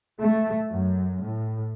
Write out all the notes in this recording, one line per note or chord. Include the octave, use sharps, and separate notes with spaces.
A3
F#2
A2